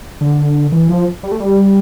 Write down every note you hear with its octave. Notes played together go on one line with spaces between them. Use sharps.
D3
E3
F3
G3
A3
G3